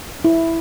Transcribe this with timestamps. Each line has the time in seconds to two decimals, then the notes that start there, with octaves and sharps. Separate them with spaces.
0.24 E4